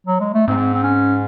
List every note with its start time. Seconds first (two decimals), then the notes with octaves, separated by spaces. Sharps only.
0.07 F#3
0.20 G#3
0.34 A3
0.48 G#2 C4
0.74 C4
0.84 C#4